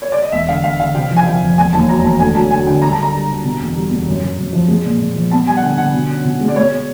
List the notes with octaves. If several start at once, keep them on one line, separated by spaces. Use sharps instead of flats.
C#5
D5
D#5
E1 E5
D3 F5
E1 F5
D3 F5
C3 G5
F3
G#5
F3 G5
F2
E1 G#5
D#2 A5
F#3 A#5
E1 A5
D2 G#5
F#3 A5
D2 G#5
D3 G5
G3 A#5
A5
D3 A#5
G3
D3
B2
E2
G3
E2
F#2
F#2
F#2
F3
G#3
A#2
A#2
F3
B3 A5
G3 G#5
F#5
D3 G5
D3 F#5
B2
C#4
B2
G#3
D5
G#3 C#5